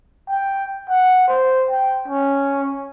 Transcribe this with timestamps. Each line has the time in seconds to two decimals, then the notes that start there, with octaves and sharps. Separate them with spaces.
0.29 G5
0.89 F#5
1.29 C5
1.71 G5
2.08 C#4